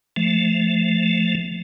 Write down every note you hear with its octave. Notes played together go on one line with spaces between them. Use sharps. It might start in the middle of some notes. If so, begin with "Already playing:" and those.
F3 A3